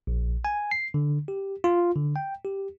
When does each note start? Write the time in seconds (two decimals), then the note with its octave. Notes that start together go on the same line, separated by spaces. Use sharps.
0.07 A#1
0.45 G#5
0.71 C7
0.94 D3
1.28 G4
1.64 F4
1.96 D3
2.16 G5
2.45 G4